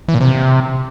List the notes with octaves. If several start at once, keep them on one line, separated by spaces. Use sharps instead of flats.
E3
A#2
C3